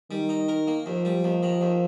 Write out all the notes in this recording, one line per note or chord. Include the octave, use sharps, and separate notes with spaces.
D#3 G3
D#4
A#4
A#3
D#2 F3
G3
D#2
D#3
D#2